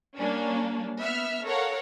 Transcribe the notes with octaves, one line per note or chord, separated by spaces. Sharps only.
G3 A#3 C#4 D4
B3 E5 F6
A4 A#4 C#5 F5 F#5